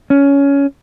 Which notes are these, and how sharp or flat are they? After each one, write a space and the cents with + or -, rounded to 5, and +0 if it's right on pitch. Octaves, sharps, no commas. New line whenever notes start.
C#4 +15